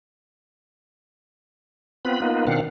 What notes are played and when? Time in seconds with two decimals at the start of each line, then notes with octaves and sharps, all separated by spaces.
2.05 B3 C4 F4 B4 B5
2.22 A#3 B3 D#4 F4 B4
2.47 B2 D#3 C4 D4 F5 F#5